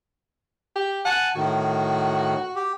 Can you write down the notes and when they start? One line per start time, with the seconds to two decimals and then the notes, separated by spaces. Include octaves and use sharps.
0.76 G4
1.05 F#5 G#5 A5
1.36 A2 D#3 F#4
2.56 G4